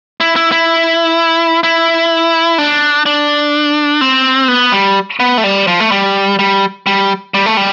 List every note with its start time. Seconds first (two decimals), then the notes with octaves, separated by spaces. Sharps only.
0.20 E4
0.36 E4
0.52 E4
1.63 E4
2.58 D4
3.06 D4
4.01 C4
4.48 B3
4.72 G3
5.20 B3
5.38 A3
5.44 G3
5.67 F3
5.80 A3
5.92 G3
6.39 G3
6.87 G3
7.34 G3
7.46 A3
7.57 G3